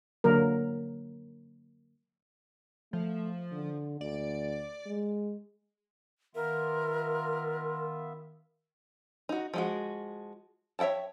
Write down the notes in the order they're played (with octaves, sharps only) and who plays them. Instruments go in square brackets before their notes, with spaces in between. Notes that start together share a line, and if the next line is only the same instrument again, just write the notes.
[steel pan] D3 F#3 A#3 A#4
[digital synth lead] F3 [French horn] A3
[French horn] D3
[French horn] D2 [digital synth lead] D5
[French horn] G#3
[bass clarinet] D#3 [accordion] B3 F4 E5 [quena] A#4
[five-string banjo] D#4 F#4
F3 G#3 F#4
C#5 E5 F#5 G5 A5